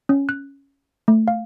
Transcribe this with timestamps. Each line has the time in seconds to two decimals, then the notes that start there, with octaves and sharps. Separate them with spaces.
0.09 C#4
0.29 F#6
1.08 A3
1.28 F5